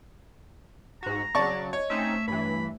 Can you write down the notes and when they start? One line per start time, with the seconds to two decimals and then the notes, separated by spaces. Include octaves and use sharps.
1.03 G#2 F#4 A#5
1.35 C#3 F#3 D5 A5 C#6
1.73 C#5 D#5
1.90 A3 C4 C#4 D#4 E5
2.28 G2 E3 B5